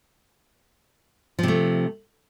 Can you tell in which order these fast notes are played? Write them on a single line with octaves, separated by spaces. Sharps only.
F3 C3 A3